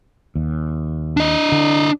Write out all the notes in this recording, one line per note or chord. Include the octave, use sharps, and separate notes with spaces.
D#2
D4 D#5
D3